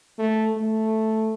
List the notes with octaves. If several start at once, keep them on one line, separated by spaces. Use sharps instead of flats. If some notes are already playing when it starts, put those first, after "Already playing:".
A3
A3